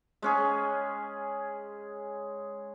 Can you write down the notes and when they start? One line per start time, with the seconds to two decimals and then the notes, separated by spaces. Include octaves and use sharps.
0.22 G#3 C#4 G#4